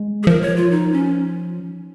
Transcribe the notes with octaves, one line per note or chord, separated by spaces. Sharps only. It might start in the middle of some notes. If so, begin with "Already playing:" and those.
Already playing: G#3
G#4
F3 A#4
C#5
F4
D#4
C#4